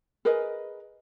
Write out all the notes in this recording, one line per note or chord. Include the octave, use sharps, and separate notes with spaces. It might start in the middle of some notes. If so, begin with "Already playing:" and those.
G#4 A#4 B4 D#5